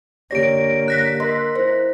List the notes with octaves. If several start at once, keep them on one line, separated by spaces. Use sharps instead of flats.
D3 A#3 G4 C#5 D5 A#6 D7
F#6 A#6 B6
A#4 D#5 C6
E4 C5